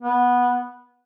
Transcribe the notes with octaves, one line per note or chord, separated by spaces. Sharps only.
B3